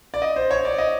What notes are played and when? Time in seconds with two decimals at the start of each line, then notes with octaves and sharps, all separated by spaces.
0.14 D5
0.22 D#5
0.36 C5
0.51 C#5
0.65 D5
0.78 D#5